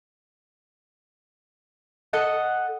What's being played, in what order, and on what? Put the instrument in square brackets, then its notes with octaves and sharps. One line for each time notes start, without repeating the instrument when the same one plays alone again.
[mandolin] A4 D#5 F#5